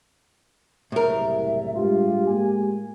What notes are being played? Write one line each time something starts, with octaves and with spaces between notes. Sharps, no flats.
F#1 C2 A2 A#4 E5
G2 G#3 F4 G4
G#3 A#3 G#5